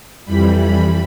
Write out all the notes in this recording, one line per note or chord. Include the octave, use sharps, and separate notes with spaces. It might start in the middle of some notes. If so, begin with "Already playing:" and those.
F2 E3 G3 B5
B5